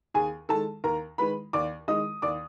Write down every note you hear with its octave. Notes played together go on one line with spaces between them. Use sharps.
D#2 G#4 G#5
D#3 G#3 A4 A5
D#2 A#4 A#5
D#3 G#3 B4 B5
D#2 D5 D6
D#3 G#3 D#5 D#6
D#2 D5 D6